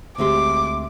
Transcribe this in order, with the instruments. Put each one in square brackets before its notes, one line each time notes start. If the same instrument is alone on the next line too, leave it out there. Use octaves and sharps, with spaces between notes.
[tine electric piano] D2 E5 C6 [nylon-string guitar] G#3 C4 G4 [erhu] D6